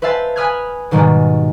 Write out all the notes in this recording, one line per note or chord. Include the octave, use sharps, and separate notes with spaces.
B4 C5 E5 F5 A5
G#5 B5 D#6 F6 F#6 G#6
G#2 B2 D#3 G3 G#3